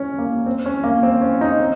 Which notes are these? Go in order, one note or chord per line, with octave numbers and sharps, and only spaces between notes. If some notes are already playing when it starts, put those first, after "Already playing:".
Already playing: C#4
A#3
C4
C#4
A#3
C4
C#4
D#4
C4